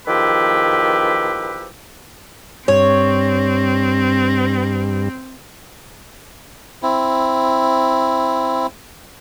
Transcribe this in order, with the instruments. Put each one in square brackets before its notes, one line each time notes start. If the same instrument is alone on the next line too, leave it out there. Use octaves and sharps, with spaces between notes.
[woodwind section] E2 D#3 F3 G4 B4 E6
[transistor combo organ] G2 [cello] C4 [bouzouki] C#5
[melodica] C4 E4